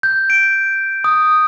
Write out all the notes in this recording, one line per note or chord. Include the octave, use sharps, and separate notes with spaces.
G6
D7
D#6